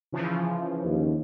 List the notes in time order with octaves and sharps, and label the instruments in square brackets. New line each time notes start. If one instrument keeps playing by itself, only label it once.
[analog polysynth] C#3 E3 F3
[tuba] D#2